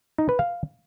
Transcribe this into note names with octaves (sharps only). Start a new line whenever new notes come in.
D#4
B4
F5